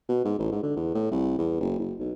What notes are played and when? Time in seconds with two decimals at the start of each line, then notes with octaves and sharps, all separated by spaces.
0.09 B2
0.25 G#2
0.39 A1
0.52 G#2
0.63 D3
0.76 E2
0.94 A2
1.11 C2
1.39 E2
1.60 F#1
1.79 F#1
1.99 B1